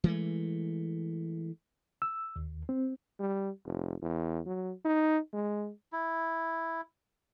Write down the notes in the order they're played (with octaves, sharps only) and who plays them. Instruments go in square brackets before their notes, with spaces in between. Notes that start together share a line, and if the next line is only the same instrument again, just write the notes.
[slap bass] E3 G#3 A3
[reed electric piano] E6
D#2
C4
[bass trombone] G3
F1
E2
F#3
D#4
G#3
[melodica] E4